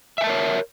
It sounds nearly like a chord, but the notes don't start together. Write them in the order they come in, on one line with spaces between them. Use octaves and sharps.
E5 G#5 A5 A#4 C#5